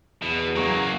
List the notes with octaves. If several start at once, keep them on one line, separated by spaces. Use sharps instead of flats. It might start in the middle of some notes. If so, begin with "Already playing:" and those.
E2 B2
F#2 F#3 A#3 G#4 C#6